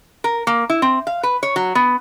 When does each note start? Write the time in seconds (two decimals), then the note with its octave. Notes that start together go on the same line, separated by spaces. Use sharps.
0.24 A#4
0.47 A#3
0.70 E4
0.82 C4
1.07 F5
1.23 B4
1.43 C#5
1.56 F#3
1.75 B3